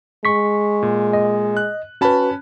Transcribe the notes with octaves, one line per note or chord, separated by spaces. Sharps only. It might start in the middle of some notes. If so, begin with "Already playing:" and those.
G#3 C#6 B6
A#2
D#5
F#6
C#4 F#4 B4 A5 B5